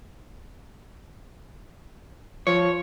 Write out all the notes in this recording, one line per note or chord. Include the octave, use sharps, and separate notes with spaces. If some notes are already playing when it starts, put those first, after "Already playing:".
F3 C#5